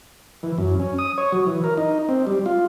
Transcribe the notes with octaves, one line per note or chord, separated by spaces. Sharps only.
E3
F#2
C#4
D#6
C#5
F#3
E3
A#4
D#4
C4
G3
F4